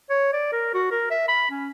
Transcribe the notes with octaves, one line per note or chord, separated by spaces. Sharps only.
C#5
D5
A#4
F#4
A#4
E5
B5
C#4